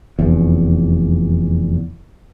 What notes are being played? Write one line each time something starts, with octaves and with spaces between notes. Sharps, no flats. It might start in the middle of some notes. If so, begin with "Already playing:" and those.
F1 E2